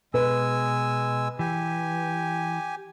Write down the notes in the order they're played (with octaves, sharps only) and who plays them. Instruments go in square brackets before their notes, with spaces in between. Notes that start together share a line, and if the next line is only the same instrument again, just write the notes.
[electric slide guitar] B2 [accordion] G#3 G#5 E6 [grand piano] B4
[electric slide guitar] E3 [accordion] G4 G#5